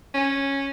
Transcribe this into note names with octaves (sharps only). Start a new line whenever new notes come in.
C#4